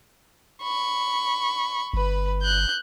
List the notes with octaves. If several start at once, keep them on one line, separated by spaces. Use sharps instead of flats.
B5 C#6
G1 B4 B5
F#6 G6